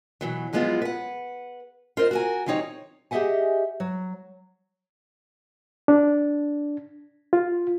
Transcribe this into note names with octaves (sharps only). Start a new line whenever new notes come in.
B2 E3 F#3
F3 F#3 G#3 B3 E4 F4
B4 F#5
F4 A#4 C5 D#5
F#4 A#4 G#5
E3 G3 C4 D#4 C#5
G4 G#4 D#5 E5 F#5 G#5
F#3
D4
F4